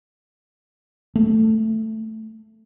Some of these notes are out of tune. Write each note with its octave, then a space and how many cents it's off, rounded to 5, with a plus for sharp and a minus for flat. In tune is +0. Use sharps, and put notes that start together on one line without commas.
A3 +5